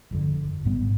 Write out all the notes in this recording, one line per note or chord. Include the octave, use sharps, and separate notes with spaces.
G1 F2 D3
G#1 G#2 G3 B3